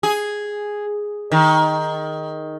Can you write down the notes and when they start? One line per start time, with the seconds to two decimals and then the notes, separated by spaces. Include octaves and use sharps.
0.03 G#4
1.32 D#3